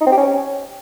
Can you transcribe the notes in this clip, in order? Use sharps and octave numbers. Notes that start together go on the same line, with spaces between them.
D#4
C4
G4
C#4